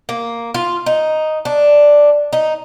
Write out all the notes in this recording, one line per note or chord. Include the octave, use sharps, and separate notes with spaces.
A#3
F4
D#4
D4
D#4